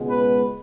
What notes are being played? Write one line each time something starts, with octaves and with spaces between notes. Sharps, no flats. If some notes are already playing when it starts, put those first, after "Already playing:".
Already playing: C#2 B2 G#3 B3
B4